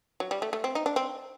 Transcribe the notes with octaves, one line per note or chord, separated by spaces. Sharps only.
F#3
G3
A3
A3
C4
D#4
D4
C4